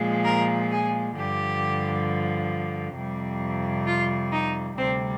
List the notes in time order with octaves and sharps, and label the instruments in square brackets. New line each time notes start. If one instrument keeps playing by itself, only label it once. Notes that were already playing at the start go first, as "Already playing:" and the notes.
Already playing: [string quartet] A#2 F3 G#3
A#4
G#4
G2 D3 F3 G4
F2 C3 G3
F4
D#4
D2 C3 G3 C4